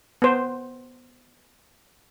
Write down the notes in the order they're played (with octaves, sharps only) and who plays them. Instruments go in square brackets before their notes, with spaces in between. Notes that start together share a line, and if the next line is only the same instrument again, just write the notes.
[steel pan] B3 C5